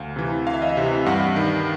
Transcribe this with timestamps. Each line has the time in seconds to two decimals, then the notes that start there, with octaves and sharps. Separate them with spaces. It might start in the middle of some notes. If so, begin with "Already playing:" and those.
Already playing: D2 F5
0.16 C3 E3
0.46 D2 F5
0.54 E5
0.62 D#5
0.69 E5
0.77 C3 E3
1.06 G2 F#5
1.36 D#3